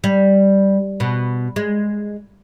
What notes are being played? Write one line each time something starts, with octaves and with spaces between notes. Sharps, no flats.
G3
B2
G#3